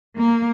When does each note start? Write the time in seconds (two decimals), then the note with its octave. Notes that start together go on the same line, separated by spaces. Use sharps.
0.17 A#3